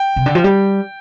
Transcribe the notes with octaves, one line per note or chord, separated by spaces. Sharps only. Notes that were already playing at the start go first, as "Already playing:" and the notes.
Already playing: G5
C3
D3
F3
G3